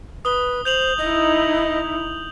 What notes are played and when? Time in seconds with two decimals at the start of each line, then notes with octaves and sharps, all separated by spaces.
0.25 B4 D#6 G7
0.65 C5 G6 F7 F#7
0.98 D#4 E4 D#5